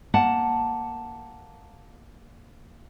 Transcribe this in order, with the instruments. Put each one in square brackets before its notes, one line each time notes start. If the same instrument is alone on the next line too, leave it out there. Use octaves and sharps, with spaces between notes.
[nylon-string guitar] A#3 F#5 A5